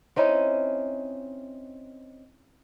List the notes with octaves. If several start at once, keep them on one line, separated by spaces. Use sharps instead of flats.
C4 C#4 D#4 E4